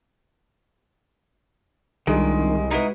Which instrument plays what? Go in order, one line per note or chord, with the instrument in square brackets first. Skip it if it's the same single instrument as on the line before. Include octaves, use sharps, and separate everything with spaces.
[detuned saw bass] C2 [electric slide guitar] D#3 [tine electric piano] G3 D4 F4 [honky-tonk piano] G#3
[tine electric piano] G#3 F#4 B4 [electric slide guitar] D#4 E4